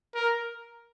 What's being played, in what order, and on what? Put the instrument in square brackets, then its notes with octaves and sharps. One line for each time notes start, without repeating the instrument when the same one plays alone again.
[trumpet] A#4